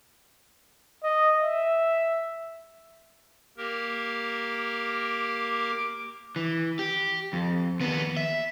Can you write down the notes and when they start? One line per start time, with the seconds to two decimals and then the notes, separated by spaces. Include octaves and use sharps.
1.04 D#5
1.42 E5
3.57 A#3 G4 A#4
4.56 D6
6.36 E3
6.79 G4
7.33 F2
7.80 D#2 B3
8.17 E5